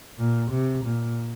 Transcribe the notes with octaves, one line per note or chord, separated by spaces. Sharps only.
A#2
C3
A#2